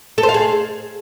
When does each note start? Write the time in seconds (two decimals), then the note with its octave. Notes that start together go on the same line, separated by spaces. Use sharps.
0.18 A4
0.23 C5
0.29 F5
0.34 G#4